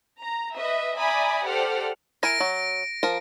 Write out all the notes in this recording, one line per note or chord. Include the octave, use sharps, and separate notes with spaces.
A#5
B4 D#5 E5
D5 E5 G#5 A#5 B5 D#6
G4 A4 C5 D5 F#5 F6
E4 A#4 G#5 A#6 D7
F#3
F3 A#4